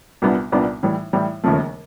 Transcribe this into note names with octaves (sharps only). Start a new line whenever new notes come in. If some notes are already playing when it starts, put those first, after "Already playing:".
C2 A#2 G3 B3 D4
C2 A#2 G3 B3 D4
A2 E3 G3
A2 E3 G3
E1 D#2 C#3 F3 A3